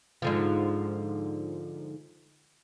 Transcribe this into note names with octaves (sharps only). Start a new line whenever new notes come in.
G#2 D3 F3